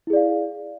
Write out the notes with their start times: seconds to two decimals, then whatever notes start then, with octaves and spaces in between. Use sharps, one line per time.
0.07 E4
0.10 G#4
0.13 D5
0.16 F5